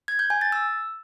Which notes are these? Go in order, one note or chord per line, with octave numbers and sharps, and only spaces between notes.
G#6
G6
G#5
A6
E6